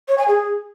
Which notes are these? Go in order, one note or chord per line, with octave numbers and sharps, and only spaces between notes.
C#5
G#5
G#4